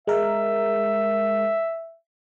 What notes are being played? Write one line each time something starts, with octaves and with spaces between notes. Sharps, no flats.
G#3 A#4 E5